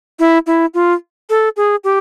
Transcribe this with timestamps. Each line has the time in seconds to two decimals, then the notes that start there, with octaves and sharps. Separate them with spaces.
0.19 E4
0.46 E4
0.74 F4
1.30 A4
1.56 G#4
1.84 G4